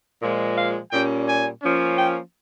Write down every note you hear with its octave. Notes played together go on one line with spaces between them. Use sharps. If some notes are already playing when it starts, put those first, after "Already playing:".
A#2 F3 G#3
F5
A#2 G3 C#4 G5
G#5
F3 A#3 C#4
G5